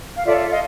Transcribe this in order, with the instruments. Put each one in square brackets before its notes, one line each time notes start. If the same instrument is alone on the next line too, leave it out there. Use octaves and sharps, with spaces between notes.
[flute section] F5
F4 A4 C#5 D5 E5
D#5 F5